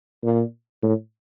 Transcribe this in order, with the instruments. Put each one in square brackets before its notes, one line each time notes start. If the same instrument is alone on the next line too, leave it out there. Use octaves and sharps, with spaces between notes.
[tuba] A#2
A2